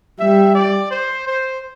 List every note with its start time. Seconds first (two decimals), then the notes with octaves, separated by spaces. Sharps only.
0.20 G3 E5
0.55 D5
0.91 C5
1.28 C5